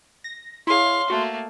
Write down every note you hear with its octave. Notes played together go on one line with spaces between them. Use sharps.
A#6
E4 G#4 C#5 F5 C6
A3 A#3 F#4